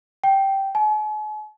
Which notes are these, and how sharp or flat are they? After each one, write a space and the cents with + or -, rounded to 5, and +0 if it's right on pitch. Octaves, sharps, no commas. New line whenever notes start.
G5 -10
G#5 +45